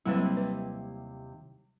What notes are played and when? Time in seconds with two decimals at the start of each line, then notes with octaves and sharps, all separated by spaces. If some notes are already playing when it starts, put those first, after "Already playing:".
0.06 D#2 C3 F#3 G3 E4 B4
0.37 B4